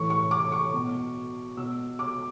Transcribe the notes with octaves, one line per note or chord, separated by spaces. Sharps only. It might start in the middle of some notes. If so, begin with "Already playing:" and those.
Already playing: A2 E3 C#6
C#6
D6
C#6
B2
B2 E6
D6